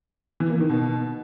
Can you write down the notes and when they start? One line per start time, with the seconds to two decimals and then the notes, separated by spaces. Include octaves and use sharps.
0.40 E3
0.50 A#3
0.60 D#3
0.69 B2